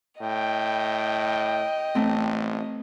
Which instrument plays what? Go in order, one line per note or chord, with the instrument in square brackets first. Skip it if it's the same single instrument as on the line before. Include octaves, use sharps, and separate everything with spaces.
[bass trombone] A2 [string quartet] D#5 [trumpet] G5
[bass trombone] A1 [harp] A3 C4